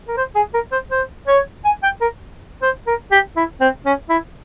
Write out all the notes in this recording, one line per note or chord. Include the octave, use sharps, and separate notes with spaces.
A#4
C5
G#4
A#4
C5
C5
C#5
G#5
G5
A#4
C5
A#4
G4
E4
C4
C#4
E4